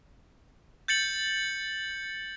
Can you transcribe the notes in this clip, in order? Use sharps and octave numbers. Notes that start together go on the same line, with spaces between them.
G6 A6 C#7 F#7